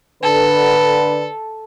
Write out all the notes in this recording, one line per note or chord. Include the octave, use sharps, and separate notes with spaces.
D3 A4 B4